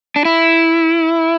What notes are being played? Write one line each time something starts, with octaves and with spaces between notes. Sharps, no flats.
D4
E4